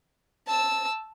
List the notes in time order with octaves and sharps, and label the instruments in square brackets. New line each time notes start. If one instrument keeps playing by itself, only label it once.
[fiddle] A5 E6